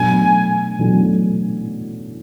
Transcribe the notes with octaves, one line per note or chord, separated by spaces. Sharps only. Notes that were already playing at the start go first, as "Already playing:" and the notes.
Already playing: B2 F#3 A3 D4 G#5
B2 F#3 A3 D4